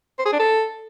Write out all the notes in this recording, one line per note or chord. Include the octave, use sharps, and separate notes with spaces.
C5
G#4
D4
A4